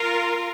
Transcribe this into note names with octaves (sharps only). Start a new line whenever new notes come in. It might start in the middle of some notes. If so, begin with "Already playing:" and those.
Already playing: F4 A#4